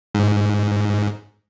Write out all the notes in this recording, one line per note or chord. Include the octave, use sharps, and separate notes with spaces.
G#2